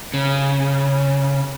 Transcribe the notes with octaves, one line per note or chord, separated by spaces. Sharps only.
C#3